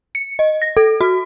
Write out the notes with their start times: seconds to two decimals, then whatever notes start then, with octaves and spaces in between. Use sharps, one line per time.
0.15 C#7
0.39 D#5
0.62 A#6
0.77 A4
1.01 F#4